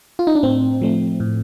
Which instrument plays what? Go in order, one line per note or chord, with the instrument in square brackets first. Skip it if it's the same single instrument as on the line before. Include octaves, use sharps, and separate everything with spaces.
[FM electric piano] F4
D#4
D4
A2 C4
F3 A3 C4
A2